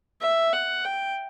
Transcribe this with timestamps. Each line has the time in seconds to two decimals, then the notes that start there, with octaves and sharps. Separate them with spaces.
0.21 E5
0.53 F#5
0.85 G5